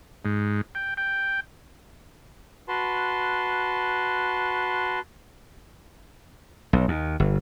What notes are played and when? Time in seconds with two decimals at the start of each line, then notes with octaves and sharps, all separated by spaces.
0.25 G#2
0.75 G5
0.97 G5
2.68 F#4 B4 A5 C6
6.73 B1
6.88 D#2
7.20 G1